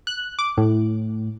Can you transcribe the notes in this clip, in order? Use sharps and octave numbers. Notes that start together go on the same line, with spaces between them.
F#6
D6
A2